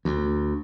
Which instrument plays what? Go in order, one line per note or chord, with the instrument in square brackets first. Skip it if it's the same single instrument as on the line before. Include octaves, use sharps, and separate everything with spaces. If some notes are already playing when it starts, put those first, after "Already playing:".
[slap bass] D2